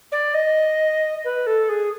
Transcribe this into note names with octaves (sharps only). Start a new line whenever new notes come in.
D5
D#5
B4
A4
G#4